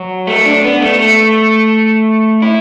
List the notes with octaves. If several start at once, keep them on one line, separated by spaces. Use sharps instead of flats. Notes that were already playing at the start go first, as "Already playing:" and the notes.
Already playing: F#3
A3
D4
B3
A3
A3
E4